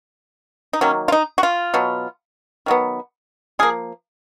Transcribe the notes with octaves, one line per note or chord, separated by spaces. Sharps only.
D#4
D#3 F#3 A#3 C#4
F4
D#4
F#4
F4
B2 F#3 B3
D#3 F#3 B3
F3 A#3 G#4